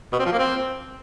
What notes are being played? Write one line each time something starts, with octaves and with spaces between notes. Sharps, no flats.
B2
C4
F3
A#3
C4